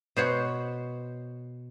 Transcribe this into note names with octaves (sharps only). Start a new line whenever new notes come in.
B2 C5 C#5 F#5